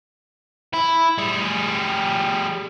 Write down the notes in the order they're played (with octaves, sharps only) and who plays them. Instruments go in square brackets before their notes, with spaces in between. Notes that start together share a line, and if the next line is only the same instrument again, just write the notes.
[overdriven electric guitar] E4
G3 G#4